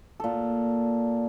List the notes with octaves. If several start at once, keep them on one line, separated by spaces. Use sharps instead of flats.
A#2 A4